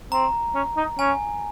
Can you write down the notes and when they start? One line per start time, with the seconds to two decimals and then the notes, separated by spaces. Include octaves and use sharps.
0.12 C4 A#5
0.55 C#4
0.77 D#4
0.99 C#4 G#5